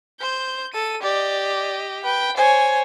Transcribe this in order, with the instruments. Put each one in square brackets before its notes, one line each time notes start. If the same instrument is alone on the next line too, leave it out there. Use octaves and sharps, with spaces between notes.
[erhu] C5 [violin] G6
[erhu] A4 [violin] D#7
[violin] G4 D#5 [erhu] D5
[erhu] B4 [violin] G5
[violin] C5 C#5 [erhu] G#5